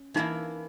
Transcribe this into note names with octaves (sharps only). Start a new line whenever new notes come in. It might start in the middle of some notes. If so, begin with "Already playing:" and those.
Already playing: C#4
E3 A#3 D#4 E4 A#4